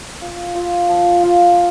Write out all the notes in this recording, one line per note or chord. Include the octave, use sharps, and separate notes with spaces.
F4
F4
F3
F4